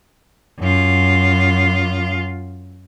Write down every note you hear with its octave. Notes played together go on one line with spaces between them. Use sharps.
F#2 F4